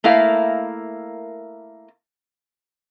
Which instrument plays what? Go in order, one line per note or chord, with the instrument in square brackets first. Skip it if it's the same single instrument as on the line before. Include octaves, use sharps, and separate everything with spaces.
[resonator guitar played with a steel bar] A3 A#3 E4 A#4 F5